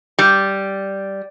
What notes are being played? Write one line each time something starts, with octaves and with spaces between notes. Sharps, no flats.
G3